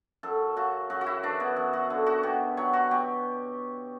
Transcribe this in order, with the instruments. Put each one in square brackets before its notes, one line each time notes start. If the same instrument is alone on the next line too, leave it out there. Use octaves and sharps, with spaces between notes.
[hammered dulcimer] F#2 A4
C#3 F#4
F#2 F#4
F#4
E4
E3 D4
B3
F#2
F#4
D3
F#4
B2 G4
F#3 C#5
F#4
B2 G4